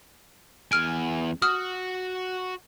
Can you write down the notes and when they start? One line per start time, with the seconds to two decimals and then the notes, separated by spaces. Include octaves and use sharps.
0.72 E2 G#5 F6 D7
1.42 F#4 D#6 F6